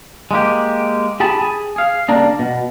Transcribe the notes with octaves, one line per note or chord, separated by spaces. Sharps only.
G#3 A#3 G4
G4 G#4 A5 B5
G#4
G#4 F5
C#3 G3 A#3 D4 A#4
B2